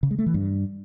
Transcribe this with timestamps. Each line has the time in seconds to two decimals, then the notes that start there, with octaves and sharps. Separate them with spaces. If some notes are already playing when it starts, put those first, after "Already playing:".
0.03 C#3
0.11 G#3
0.19 A3
0.26 E3
0.34 G2